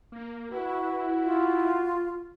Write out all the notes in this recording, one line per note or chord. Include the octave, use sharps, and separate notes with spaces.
A#3
E4 F#4 B4
F4